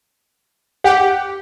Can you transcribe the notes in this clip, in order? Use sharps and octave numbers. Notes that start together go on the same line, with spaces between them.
G4 F#5